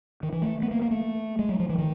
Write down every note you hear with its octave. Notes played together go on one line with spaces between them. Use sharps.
D#3
E3
A3
B3
A#3
A#3
A3
G#3
F#3
F3
E3
D#3